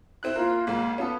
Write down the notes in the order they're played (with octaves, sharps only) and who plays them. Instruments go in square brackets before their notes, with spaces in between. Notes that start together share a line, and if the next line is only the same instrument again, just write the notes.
[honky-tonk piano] C4 E4 F#6
[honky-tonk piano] A#3 A#4 [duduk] F4
[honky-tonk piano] B1 G#2 G#3 [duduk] A#3
[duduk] B3 [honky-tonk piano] C#4 F4 A4